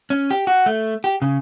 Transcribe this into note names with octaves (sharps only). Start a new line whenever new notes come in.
C#4
G4
F#4
A3
G4
C#3